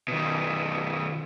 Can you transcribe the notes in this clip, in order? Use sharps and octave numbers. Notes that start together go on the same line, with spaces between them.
B2 D#3